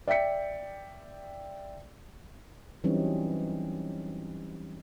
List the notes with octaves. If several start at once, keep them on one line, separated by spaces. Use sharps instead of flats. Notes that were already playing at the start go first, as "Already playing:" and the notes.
D5 E5 G5 B6 C#7
E3 F#3 G3 C4 C#4 D#4